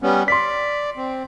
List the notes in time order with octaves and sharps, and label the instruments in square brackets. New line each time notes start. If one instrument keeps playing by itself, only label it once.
[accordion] G3 B3 C#4
[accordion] D5 [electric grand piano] C6 B6
[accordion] C4